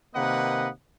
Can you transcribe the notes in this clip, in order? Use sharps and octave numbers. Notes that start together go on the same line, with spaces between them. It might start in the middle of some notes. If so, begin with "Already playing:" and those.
C3 D#3 A#3 B4 D#5 F#5